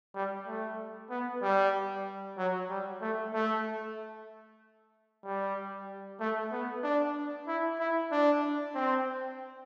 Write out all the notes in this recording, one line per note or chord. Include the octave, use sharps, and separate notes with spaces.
G3
A3
B3
G3
F#3
G3
A3
A3
G3
A3
B3
D4
E4
E4
D4
C4